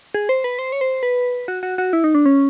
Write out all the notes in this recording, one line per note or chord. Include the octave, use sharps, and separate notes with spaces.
G#4
C5
B4
C5
C#5
C5
B4
F#4
F#4
F#4
E4
D#4
D4
C#4